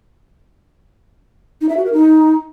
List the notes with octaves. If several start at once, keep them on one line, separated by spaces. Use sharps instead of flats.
D#4
E5
F#4
A#4
D#4